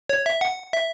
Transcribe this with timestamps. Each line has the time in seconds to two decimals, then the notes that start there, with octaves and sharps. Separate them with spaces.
0.09 C#5
0.26 E5
0.41 F#5
0.73 E5